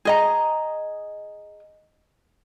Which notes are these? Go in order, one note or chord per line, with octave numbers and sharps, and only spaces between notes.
G#4 D#5 A#5